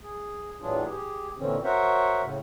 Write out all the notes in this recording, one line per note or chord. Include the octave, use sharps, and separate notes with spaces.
G#4
A2 E3 F#3 D4 F4 G#4
G4 G#4
A#2 D3 E3 C4 C#4
F#4 A#4 C5 C#5 E5 F#5
A2 C#3